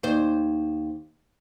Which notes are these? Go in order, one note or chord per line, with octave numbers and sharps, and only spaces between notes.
D#2 C5